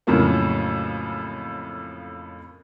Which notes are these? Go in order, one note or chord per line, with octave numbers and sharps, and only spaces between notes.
F2 A2 C#3 F#3 A#3